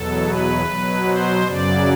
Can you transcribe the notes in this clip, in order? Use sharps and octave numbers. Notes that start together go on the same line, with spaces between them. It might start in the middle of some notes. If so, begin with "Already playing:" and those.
Already playing: E2 B2 F#3 A4
B4
B2 F#3
C5
F#2 C#3 F#3 D5